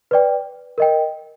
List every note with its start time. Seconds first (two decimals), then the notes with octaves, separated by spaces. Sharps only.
0.11 B4 D5 G5
0.78 A#4 D#5 G5